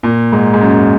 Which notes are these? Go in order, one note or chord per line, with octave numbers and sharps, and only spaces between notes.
A#2
G#2
G#2
F#2